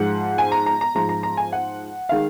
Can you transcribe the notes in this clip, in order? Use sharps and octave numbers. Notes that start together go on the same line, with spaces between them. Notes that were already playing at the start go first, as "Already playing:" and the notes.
Already playing: G#2 F3 G#3 F#5
G#5
A#5
A#5
A#5
G#2 F3 G#3 A#5
A#5
A#5
G#5
F#5
D#3 G#3 F5